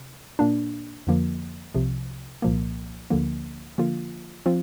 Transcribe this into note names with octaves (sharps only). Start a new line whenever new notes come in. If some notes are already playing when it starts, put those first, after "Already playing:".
Already playing: C3
A#2 A#3 D4
F2 D3 F3 A#3
C2 C3 F3
C2 A#2 F3 A#3
D2 D3 F3 A#3
D3 F3 A#3 F4
F3 C4 F4